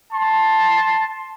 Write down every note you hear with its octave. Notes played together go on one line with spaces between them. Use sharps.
A5 C6